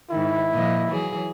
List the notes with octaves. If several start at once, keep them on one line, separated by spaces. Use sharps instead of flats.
G#2 D#3 E4
A#2 F3 D#5
E3 F#3 G#4